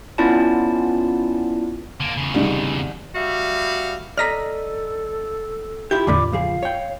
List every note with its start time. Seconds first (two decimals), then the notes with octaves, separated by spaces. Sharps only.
0.18 B3 C#4 E4 F4 D5 A5
2.00 D3 A#3
2.17 E2 C#3
2.34 C2 D#3 G#3
3.15 G3 F#4 E5 F5
4.17 A4 D5 D#5 A#5 F6 A#6 B6
5.91 E4 F4 G4 G6
6.07 E2 A2 D3 F4 D5 B5 D6
6.32 C#2 F3 G#4 F5
6.63 C#5 G5